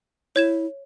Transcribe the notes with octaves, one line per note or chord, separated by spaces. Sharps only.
E4 C#5 G#6 E7